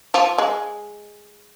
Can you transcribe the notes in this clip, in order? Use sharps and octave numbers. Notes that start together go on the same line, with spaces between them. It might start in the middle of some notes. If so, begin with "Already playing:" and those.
F3
G#3